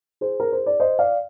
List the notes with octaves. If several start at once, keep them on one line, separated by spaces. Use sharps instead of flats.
G#4 C5
A#4
C5
D5
C5 D#5
D5 F5